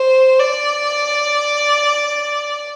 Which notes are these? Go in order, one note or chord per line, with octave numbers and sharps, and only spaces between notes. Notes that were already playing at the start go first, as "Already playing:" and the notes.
Already playing: C5
D5